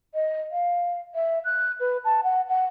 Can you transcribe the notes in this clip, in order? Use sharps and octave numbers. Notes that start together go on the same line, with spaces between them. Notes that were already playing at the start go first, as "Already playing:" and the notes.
D#5
F5
E5
F#6
B4
A5
F#5
F#5